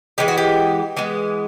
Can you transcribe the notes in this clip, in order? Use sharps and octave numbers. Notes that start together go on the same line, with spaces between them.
E3 G#3 B3 G4
F#4
G4
E3 G#3 B3